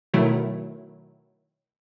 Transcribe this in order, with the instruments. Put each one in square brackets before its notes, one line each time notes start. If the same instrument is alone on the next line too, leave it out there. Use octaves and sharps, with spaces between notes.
[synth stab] B2 D#3 F#3 A3 E4